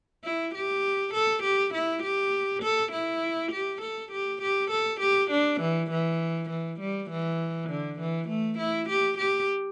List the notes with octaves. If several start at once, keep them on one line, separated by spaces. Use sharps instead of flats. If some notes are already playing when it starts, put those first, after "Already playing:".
E4
G4
A4
G4
E4
G4
A4
E4
G4
A4
G4
G4
A4
G4
D4
E3
E3
E3
G3
E3
D3
E3
A3
E4
G4
G4